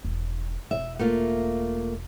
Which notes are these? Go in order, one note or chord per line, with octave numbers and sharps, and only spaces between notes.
E1
E1 E5
A3 A#3 F4